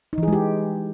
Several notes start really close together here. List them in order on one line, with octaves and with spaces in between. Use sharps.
D#4 E3 G#4 G#3 G4